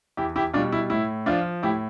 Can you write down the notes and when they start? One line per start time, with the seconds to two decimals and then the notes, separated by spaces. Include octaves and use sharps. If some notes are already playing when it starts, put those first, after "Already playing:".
0.17 E2 E4 G4
0.36 E4 G4
0.54 B2 D4 F4
0.57 G3
0.72 E4
0.90 A2 E4
1.26 F3 D4 F4
1.63 A2 E4 G4